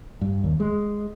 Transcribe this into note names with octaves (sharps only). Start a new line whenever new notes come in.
G2
D#2
G#3